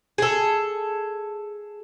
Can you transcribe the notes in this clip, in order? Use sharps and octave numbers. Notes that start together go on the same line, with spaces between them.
G#4 A4